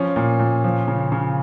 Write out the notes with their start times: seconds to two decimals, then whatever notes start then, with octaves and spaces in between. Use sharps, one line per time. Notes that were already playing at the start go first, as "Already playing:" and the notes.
Already playing: F3 C#4
0.16 A#2
0.39 A#2
0.64 F3
0.88 C#3
1.12 C#3